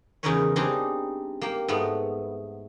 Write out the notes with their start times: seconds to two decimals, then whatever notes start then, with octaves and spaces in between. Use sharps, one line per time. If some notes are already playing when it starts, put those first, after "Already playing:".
0.23 E2 C#3 D#4 A#4 B4 C#5
0.56 G3 C4 D4 D#4 G#4
1.41 A#3 G4
1.68 G#2 A3 B3